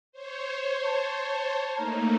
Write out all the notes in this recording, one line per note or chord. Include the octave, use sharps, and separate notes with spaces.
C5 C#5
A5
A3 A#3 D#4 A#4